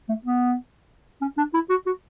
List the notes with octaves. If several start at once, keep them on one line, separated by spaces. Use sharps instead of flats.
A3
B3
C#4
D4
E4
F#4
F#4